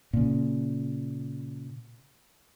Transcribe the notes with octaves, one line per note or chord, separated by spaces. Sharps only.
A#2 C#3